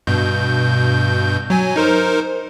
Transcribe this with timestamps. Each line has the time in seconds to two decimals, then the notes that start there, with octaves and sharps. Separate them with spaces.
0.07 G2 B2 G6
1.50 F#3 G#5
1.76 D#4 A#4 C5